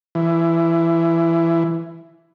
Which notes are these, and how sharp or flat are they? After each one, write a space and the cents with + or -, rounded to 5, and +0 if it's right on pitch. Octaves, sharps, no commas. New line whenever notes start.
E3 +15